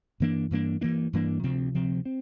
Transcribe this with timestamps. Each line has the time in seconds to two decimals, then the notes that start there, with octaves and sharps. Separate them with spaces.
0.20 G2 E3 A#3 D4
0.51 G2 E3 A#3 D4
0.81 G2 E3 A#3 D4
1.13 G2 E3 A#3 D4
1.44 D2 C3 F3 C4
1.75 D2 C3 F3 C4
2.05 C4